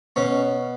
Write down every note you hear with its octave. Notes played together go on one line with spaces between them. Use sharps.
B2 C#4